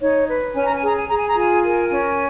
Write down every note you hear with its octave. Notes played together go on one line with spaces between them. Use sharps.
D#4 C#5
B4
C#4 G#5
A#5
G#5
G#4
A#5
G#5
G#4 A#5
G#5
A#5
F4 G#5
A#4 G#5
C#4 G#5